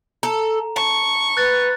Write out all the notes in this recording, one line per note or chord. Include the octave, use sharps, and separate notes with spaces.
A4 A#5
A5 C#6
B4 F#6 A6